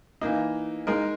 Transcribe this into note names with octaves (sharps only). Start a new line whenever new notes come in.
E3 A#3 D#4
G#3 D#4 A#4